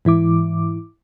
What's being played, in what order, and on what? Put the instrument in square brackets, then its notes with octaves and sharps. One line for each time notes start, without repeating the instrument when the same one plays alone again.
[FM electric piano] G#2 E3 E4 D6